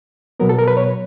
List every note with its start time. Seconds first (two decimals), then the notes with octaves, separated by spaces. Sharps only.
0.40 B2 F#3 B3 A#4
0.49 A4
0.58 A#4
0.68 B4
0.77 C#5